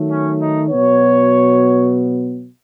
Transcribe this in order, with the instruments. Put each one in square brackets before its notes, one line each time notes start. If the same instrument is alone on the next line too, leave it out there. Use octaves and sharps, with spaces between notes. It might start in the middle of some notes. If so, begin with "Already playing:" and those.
Already playing: [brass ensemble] D#3 F#3 A3
C#4
D#4
B2 F#3 B3 C#5